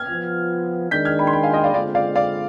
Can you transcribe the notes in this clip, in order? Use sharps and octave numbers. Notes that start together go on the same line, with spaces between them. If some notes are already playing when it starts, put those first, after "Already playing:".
Already playing: F6 G#6
F3 B3 F4
D#3 G#3 D4 G6 B6
F6 G#6
G5 B5
C6
G5 B5
F5 G#5
D#5 G5
D5 F5
D3 G#3 C4 F4 D5 F5
D5 F5
D5 F5